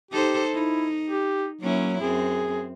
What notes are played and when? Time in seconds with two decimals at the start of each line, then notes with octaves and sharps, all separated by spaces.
0.11 D#4 G4 A4 C5
0.53 D#4 E4
1.10 G4
1.61 F#3 A#3 C#4 E4
2.01 F#2 C4 G#4